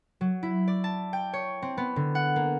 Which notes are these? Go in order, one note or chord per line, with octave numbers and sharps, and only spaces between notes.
F#3
E4
D5
A5
G5
C#5
C4
B3
D3
F#5
A#3